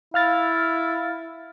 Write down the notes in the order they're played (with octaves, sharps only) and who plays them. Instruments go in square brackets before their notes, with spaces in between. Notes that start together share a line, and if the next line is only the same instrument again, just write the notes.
[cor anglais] E4 [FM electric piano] F5 F6 A6